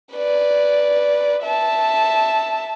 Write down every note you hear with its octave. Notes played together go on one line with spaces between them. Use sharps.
B4 D5
E5 A5